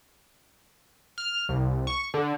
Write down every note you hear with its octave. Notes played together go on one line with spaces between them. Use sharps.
F6
C2
C#6
D3